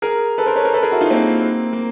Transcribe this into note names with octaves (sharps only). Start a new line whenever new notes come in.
G#4 A#4
A4 B4
A#4 C5
B4 C#5
A#4 C5
A4 B4
G#4 A#4
E4 F#4
D#4 F4
A#3 C4
A#3